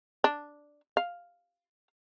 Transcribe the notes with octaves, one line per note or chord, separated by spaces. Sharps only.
D4
F5